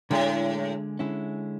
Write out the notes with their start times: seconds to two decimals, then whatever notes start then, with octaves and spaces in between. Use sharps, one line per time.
0.10 A2 D3 G#3 D4 G#4
0.99 D3 G#3 C#4 E4